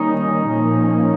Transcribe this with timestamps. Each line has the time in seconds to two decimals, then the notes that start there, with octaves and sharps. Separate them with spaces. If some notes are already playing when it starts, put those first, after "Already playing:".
Already playing: D#3 G3 A#3 C#4 D#4
0.48 A#2 F3 A#3 C#4